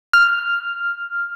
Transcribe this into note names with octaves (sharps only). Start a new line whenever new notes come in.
F6